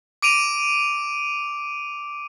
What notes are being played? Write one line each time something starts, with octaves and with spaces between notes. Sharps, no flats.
D6 D7 D#7 F7